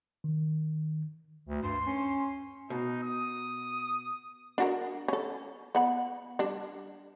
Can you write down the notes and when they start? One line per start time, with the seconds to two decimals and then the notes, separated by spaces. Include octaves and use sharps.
0.24 D#3
1.48 D2
1.63 G2 C6
1.86 C#4
2.70 B2 D#4
3.03 D#6
4.58 D4 F#4 A#4
5.08 C#4 A4
5.75 B3 F#5 B5
6.39 G3 D4